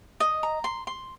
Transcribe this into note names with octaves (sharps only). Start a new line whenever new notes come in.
D#5
A#5
C6
C6